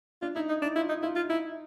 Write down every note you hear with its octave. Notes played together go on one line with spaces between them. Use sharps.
D4 F4
D#4 E4
D#4
D4 E4
E4 F4
D#4
E4 F4
F4
D#4 E4